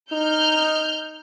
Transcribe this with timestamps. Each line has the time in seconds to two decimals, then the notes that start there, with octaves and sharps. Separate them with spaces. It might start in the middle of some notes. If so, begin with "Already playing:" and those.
0.12 D#4 F6 G6